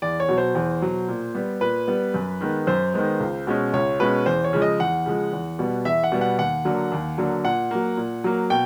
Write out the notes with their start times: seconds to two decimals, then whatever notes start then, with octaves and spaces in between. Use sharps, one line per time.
0.02 E2 D5
0.20 C#5
0.29 B2 F#3
0.38 C5
0.55 E2
0.82 B2 F#3
1.08 A#2
1.35 G3 B3
1.61 A#2 B4
1.88 G3 B3
2.14 F#2
2.41 D#3 G#3 B3
2.67 F#2 C5
2.94 D#3 G#3 B3
3.20 C#2
3.47 B2 G#3 C#4
3.73 C#2 C#5
4.00 B2 G#3 C#4 B4
4.26 E2 C5
4.44 C#5
4.53 C#3 F3 G#3
4.62 D#5
4.80 E2 F#5
5.06 C#3 F3 G#3
5.33 E2
5.59 B2 G3 B3
5.85 E2 E5
6.04 F#5
6.12 B2 G3 B3
6.21 F#5
6.39 D#2 F#5
6.65 D3 F#3 A#3
6.92 D#2
7.18 D3 F#3 A#3
7.45 A#2 F#5
7.71 F#3 A#3
7.97 A#2
8.24 F#3 A#3
8.50 B2 G5